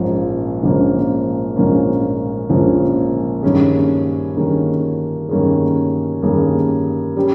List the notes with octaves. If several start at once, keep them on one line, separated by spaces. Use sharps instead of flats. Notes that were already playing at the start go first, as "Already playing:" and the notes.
Already playing: A#1 G#2 F3 A#3 C#4
A#1 G#2 F3 A#3 C#4
A#1 G#2 F3 A#3 C#4
A#1 G#2 F3 A#3 C#4
G2 D#3 A#3 C#4 G#4
G2 D#3 A#3 C#4 G#4
G2 D#3 A#3 C#4 G#4
G2 D#3 A#3 C#4 G#4
G3 C#4 G4